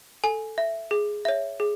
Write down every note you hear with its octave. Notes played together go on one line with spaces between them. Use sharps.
A4 G#5
E5
G#4
C#5 E5
G#4